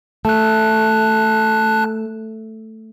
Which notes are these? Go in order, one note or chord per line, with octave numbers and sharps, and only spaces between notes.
A3 A5 F#6